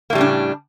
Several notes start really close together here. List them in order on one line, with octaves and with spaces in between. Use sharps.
A#3 A2 G3 C#3 D4